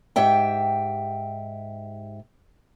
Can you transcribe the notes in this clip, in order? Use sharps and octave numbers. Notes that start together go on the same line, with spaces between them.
G#2 G4 E5 G5